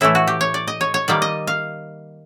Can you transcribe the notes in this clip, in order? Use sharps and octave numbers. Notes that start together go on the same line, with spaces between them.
A2 E3 A3 E4
F#4
G4
C#5
D5
D#5
C#5
C#5
D#3 G3 A#3 D5
D#5
F5